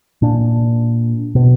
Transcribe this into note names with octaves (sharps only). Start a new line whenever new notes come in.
A#2 D4
B2